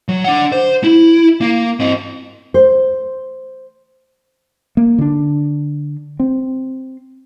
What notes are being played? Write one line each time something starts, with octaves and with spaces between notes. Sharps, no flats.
F#3
D4 F#5
C5
E4
A#3
C4 D#5
C5
A#3
D3 D4
C4